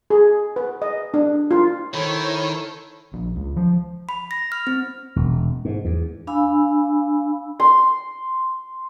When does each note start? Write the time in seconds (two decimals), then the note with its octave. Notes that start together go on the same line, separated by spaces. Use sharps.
0.10 G#4
0.56 B4
0.82 D#5
1.14 D4
1.51 F4
1.94 D#3 E4 A4 C5 C#5 B5
3.13 A#1
3.36 C#2
3.56 F3
4.09 B5
4.31 A#6
4.52 F6
4.67 C4
5.16 E1
5.65 G#2
5.85 E2
6.27 D4 F5 G#5 B5 E6
7.60 C6